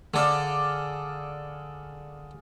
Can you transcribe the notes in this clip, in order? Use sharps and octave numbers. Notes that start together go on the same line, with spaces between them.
D3 G#4 A4 D5 F5